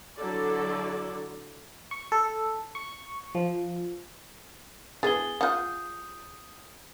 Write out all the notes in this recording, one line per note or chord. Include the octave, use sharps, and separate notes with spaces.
D3 F#3 E4 A4 D5
C#6
A4
C#6
F3
E3 B3 G#4 A6 G7
F4 F#5 D#6 G6